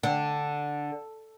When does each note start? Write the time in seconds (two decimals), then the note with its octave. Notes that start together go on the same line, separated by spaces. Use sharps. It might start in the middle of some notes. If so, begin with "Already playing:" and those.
0.03 D3